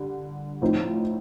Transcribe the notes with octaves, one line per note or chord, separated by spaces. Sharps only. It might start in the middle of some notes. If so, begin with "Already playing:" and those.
Already playing: D3 G3
A2 F3 C4 D#4